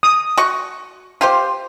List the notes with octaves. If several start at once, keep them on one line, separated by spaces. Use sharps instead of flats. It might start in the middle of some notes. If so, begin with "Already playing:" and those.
D#6
F#4 C#6
F4 G4 C5